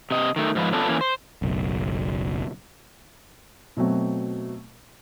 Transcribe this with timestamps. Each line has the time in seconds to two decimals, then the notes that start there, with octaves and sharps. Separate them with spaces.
0.11 C3 D#5
0.36 D#3 A3
0.55 G#2 F3 B4
0.73 B3 C#4 D4 F4 A4 B4
0.87 E3 A#3 C#4
1.01 C5
1.42 F#1 B1
3.77 B2 F#3 A3 C4